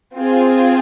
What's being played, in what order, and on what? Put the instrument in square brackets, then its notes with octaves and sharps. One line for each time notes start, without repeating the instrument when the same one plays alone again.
[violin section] C4 F4 G#4